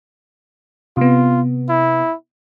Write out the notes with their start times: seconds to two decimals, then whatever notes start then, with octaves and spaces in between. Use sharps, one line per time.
0.97 C3 B3 F4
1.69 E4